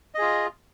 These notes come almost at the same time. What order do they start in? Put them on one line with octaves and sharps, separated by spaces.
D#5 G#4 F4